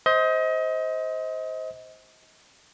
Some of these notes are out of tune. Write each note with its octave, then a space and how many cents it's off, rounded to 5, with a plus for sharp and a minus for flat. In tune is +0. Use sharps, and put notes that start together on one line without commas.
C5 +0 D#5 +30